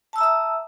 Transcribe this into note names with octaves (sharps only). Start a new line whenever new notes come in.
E5 A5 A#5 D#6 E6